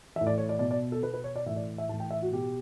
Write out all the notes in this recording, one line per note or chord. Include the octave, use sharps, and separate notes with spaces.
E3 E5
A2
D5
C#5
D5
B2 D5
D5
A4
B2 B4
B4
C#5
D5
A2 E3 E5
D5
E5
A2 E3 A5
G5
E5
F#4
B2 G4